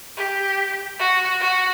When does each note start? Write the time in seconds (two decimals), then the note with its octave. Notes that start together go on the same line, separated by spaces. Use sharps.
0.17 G4
1.00 F#4
1.41 F#4